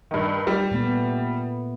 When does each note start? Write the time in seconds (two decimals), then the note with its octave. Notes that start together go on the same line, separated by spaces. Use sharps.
0.11 G2 D#3
0.47 G3
0.71 A#2 A3 B3